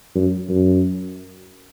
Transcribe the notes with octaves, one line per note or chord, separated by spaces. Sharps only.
F#2
F#2